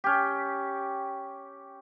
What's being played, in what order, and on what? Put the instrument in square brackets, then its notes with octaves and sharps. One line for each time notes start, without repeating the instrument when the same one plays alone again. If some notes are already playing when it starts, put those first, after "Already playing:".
[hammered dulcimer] C#4 G4